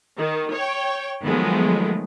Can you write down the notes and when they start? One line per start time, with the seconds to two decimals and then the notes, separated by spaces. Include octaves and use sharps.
0.18 D#3
0.54 C#5 G5
1.24 D#3 F3 F#3 G#3 A3 B3